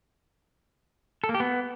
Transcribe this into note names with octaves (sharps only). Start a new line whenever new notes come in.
A4
A#3
G4
B3